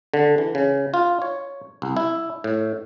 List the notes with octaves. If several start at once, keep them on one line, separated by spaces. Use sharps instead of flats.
D3
E3
C#3
F4
C#5
C2
E4
A2